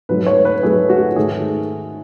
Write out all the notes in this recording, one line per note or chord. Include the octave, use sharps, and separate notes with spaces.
G#2 F#3 A3 B4
C#5
B4
G#2 F#3 A3 G#4
F#4
G#2 D#3 A3 G#4